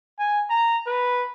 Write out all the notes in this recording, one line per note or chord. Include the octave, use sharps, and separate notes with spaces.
G#5
A#5
B4